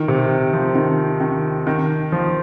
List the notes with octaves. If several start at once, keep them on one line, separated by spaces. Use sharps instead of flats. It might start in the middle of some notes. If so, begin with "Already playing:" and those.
Already playing: D#3
C3
F3
D#3
D#3
D#3
F3